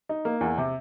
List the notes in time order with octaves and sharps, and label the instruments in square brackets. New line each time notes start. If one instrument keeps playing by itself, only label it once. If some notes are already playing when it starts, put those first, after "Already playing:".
[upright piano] D#4
A#3
E2
C3